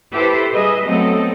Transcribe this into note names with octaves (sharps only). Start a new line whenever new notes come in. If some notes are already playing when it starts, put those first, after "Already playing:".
E4 G4 A4 B4 C5
G3 G#4 B4 D#5 E5
F#3 A3 B3 C4 A4 D#5